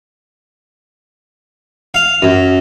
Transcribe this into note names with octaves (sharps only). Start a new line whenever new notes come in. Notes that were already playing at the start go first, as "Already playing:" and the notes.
F5
F#2